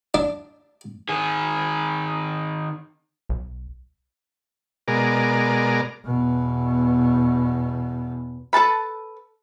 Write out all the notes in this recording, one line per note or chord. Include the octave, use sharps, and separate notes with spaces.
D4
D#3 G#4
B1
B2 G#3 A#4 D5
E2 B2
A4 B4 A5 B5